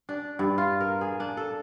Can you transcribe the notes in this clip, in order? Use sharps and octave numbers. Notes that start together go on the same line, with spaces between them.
D4
G2
F4
A#4
G#4
D4
A4